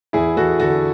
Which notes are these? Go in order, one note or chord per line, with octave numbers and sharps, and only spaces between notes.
E2 E4 G#4
E2 F#4 A4
D3 F#4 A4